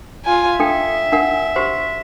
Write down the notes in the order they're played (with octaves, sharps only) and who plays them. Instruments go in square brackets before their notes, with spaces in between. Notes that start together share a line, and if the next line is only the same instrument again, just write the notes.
[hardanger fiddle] F4 G#5
[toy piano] D4 A4 G5 [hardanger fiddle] E5
[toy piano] D4 A#4 F#5
F#4 G4 C5